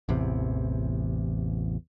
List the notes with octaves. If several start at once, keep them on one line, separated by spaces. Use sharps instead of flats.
A1 E2 C3